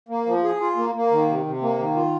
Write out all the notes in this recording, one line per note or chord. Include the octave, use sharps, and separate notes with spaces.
A#3
F3
G#4
F4
A#3
A#3
D#3
C3
C3
A#3
D#3
F4